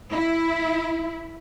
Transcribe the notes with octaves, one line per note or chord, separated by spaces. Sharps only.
E4